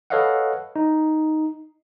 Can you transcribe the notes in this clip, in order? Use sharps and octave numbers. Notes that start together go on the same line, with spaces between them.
A4 B4 C#5 D#5 F5 F#5
D#4